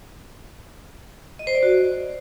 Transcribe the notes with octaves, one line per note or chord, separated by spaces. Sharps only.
D#5
C5
D5
F#4